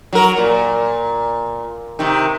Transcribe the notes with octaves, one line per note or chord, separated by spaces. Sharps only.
F#3 A#4
A#2
C3 D#3